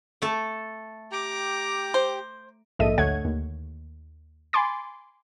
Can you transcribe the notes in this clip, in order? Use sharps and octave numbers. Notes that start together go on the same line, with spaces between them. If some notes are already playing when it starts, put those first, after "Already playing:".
A3 A4
G4 G5 A#5 D6
C5
A#1 G#2 A4 D#5 E5 D#7
D2 D3 A3 C#5 F#5 G#6
D#2
G#5 B5 C6 D6 A6